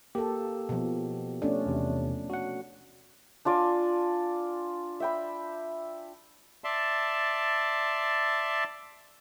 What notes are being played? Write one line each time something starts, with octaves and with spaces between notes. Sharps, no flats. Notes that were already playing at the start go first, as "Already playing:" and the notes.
A#3 G4 A4
B2 F3
A3 C#4 D4
E2 C3
F#4 F#5
D4 F4 D5 G#5
E5 G5 B5
D5 E5 A5 C6